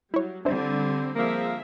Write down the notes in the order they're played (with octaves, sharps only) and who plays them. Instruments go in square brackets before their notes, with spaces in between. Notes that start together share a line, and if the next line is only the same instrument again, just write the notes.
[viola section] F#3 G3 [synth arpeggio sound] E4 C#5
[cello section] D3 G3 [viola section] C4 [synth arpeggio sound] D4 E4 C5
[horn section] F3 A#3 [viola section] C4 G#4 E5